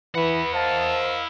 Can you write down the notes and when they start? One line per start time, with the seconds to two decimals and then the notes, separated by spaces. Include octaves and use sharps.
0.15 E3 E4 B4 F#5
0.54 A#4 C5 D#5 F5 A5